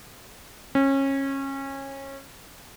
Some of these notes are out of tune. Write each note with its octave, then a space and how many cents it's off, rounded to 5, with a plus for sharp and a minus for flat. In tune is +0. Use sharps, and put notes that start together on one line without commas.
C#4 -25